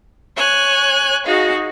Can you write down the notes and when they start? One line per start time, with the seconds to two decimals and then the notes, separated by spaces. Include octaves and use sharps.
0.36 C#5 G#5 F#6
1.26 D#4 F#4 G#4 F5